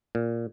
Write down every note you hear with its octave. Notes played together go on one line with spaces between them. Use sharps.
A#2